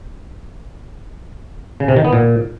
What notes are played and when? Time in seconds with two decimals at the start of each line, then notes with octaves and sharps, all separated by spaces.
1.80 C#3
1.88 C3
1.96 D#3
2.05 B3
2.13 A#2